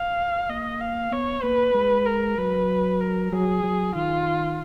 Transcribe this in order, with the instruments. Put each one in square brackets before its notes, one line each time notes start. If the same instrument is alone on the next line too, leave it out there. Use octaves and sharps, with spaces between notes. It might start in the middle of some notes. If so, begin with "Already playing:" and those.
Already playing: [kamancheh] F5
[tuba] A#3 [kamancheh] D#5
[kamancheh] F5
[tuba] B3 [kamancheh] C#5
[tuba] A#3 [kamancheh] B4
[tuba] G#3
[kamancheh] A#4
[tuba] F#3 [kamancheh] B4
[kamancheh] A#4
[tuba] F#3 [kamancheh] G#4
[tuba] F#3
[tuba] D#3 [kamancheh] F4